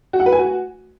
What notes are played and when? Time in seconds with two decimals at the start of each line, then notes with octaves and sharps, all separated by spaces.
0.13 F#4
0.20 F#5
0.26 B4
0.32 G#5
0.39 F#4